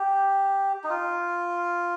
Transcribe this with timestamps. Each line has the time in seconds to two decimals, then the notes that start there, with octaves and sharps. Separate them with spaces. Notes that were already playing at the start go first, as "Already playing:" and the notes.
Already playing: G4
0.84 D#4
0.90 F4